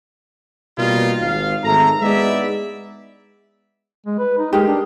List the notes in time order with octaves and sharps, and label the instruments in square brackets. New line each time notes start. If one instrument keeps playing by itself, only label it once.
[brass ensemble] B2 G3 A#3 D#4 F4
G#1 F5
G#1 A3 A4 A#5
G#3 B3 D#4 E4 D5 E5
[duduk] G#3
B4
D#4
[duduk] G#3 [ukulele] G4 G#4 A#4
[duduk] D4